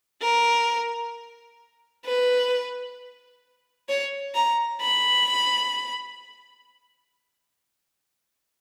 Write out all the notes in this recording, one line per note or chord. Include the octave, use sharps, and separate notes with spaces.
A#4
B4
C#5
A#5
B5